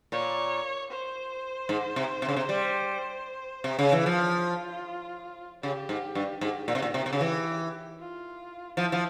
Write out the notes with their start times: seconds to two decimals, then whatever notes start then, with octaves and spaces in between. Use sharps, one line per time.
0.12 A#2 C#5
0.91 C5
1.69 G#2
1.96 C3
2.22 C3
2.29 C#3
2.37 C3
2.49 G3
3.64 C3
3.79 C#3
3.92 E3
4.06 F3 F4
5.63 C#3 G4
5.89 G#2
6.15 G2
6.41 G#2 G4
6.68 A#2
6.75 C3
6.82 A#2
6.94 C3
7.06 C3
7.13 C#3
7.21 E3
7.99 F4
8.77 F3 E4
8.92 F3